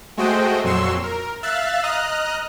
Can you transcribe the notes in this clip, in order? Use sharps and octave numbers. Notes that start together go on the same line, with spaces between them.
G#3 A3 F#4 C5 D#5 G5
F2 A#2 F#3 C6 C#6 E6
A#4
E5 F5 E6 F#6 A6
D#5 A#5 D#6 F6 F#6